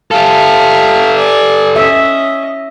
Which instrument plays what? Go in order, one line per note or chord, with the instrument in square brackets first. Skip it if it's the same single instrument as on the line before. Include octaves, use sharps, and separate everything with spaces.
[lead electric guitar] G4 A4 [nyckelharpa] E5 F5
[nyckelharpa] D5 G#5
[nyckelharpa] C#4 D#5 [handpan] E5